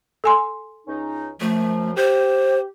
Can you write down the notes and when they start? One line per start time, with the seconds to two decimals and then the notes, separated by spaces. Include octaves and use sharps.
0.24 A4 G#5 C6
0.87 C#2 C#4 D#4
1.41 F#2 F3 A3
1.96 G4 C5